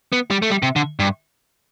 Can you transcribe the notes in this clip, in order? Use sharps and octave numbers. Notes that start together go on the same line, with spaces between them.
B3
G3
A3
G3
C3
D3
G2